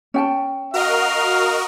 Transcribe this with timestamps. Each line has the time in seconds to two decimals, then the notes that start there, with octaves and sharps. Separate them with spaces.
0.14 C#4 G5 A5
0.74 F#4 A#4 D#5 F5